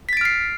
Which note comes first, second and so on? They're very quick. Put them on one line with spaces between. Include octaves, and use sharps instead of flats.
B6 A6 D7 F6 C7